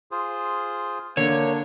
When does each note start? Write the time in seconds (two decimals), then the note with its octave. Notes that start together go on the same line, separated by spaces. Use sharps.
0.11 F4 G#4 C5
1.17 D3 A#3 D4 C#5